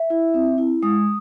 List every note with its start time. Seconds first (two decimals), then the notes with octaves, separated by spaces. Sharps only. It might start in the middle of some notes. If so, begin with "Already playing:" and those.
Already playing: E5
0.10 E4
0.34 C4
0.58 E4
0.82 G#3 D#6